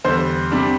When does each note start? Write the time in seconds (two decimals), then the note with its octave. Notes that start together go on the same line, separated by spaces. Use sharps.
0.04 E2 D3 G3 C5
0.51 C3 G3 D4